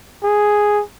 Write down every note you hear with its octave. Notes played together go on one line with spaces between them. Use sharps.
G#4